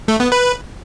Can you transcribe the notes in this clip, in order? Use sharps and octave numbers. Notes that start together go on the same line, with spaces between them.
A3
B3
B4